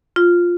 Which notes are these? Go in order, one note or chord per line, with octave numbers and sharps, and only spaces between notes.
F4